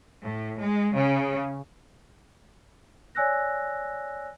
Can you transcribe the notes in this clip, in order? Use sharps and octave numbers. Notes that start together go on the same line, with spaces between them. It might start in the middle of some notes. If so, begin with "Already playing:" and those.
A2
G#3
C#3
C#5 D5 G#5 E6 F#6 A#6